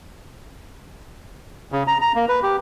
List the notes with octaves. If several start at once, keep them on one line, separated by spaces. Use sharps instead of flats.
C#3
A#5
A#5
A#3
B4
G4